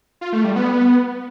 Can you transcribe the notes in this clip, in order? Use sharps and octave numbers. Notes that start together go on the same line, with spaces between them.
F4
A3
G3
B3